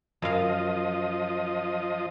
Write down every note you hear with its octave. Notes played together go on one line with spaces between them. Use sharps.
F#2 F3 D#5 F5